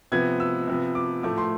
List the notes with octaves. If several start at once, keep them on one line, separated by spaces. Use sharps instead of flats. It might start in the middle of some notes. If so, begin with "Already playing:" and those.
C3 F3 B3 G#6
E6
C3 F3 B3
D6
A2 F3 A3 D6
C6